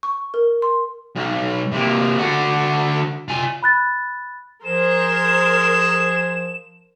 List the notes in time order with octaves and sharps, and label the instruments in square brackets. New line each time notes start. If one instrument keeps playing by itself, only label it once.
[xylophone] C#6
A#4
C6
[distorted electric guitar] B1
C3 A#3
D3 F#4
F4 G#5
[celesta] B5 F#6 A6
[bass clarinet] F3 [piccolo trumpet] G#4 [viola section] A#4 C5 [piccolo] E7